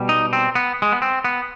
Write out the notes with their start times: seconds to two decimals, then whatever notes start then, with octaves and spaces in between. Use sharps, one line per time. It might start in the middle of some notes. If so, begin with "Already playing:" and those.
Already playing: B2 G3
0.09 D#4
0.33 C4
0.55 B3
0.82 G#3
0.92 B3
1.02 C4
1.25 B3